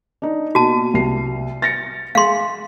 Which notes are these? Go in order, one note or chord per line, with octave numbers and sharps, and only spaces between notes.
D4 D#4
B2 A#3 F#4 A5
C2 C7
A6 A#6 C#7
G#3 F5 C6